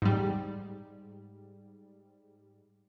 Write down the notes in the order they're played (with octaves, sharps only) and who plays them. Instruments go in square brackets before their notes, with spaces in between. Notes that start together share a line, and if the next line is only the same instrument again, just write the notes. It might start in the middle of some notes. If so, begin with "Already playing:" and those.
[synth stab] G#2 G3